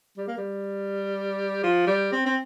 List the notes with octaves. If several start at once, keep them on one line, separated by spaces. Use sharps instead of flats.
G3
A#3
G3
F3
G3
C4
C4